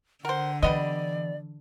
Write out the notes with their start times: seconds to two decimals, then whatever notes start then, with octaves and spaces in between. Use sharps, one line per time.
0.25 D3 A#4 C5 F#5
0.63 E3 G3 B3 D5 D#5